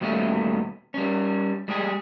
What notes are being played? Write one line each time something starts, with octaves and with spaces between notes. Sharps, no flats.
D#2 B2 G3 A3 C#4
G3 C#4
G3 G#3 G4 G#4